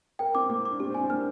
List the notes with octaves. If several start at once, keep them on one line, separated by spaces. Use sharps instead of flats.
A#4 G5
C4 D6
A#3 D6
D6
D4
C4 G4
C4
D4 G#5
C4
A#3 F6